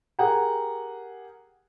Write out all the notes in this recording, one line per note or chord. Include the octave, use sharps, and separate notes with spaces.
G4 G#4 A#4 F#5 G5 A#5